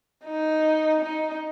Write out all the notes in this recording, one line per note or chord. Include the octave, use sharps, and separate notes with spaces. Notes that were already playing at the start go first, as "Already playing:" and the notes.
D#4
D#4